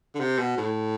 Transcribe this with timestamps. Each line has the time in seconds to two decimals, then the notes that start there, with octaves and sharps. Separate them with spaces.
0.15 D3
0.20 C3
0.39 B2
0.58 A2